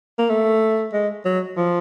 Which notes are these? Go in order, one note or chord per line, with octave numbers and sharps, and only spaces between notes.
A#3
A3
G#3
F#3
F3